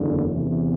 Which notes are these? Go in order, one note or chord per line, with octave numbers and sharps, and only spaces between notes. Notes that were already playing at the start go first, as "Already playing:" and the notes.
Already playing: F#1 E2 D3
E2 C3 E3